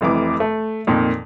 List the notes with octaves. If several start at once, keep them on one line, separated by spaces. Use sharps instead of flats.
F1 F2 E3 D6
A3
F2 A#2 D#3